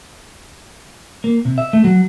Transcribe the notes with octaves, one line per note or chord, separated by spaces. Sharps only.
A#3
C3
E5
A3
F#3